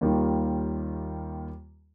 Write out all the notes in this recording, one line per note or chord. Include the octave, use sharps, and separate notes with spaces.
D#2 D#3 G3 A#3 F4